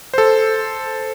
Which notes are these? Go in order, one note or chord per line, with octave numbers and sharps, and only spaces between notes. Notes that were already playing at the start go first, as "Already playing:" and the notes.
A4 C5